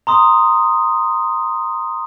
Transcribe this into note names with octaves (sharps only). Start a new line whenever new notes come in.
A#5 C6 D#6